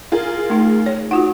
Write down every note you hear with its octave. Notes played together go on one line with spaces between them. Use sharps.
F4 G#4 A#4
A3 D#4
C#5
D#4 F4 F#4 F#5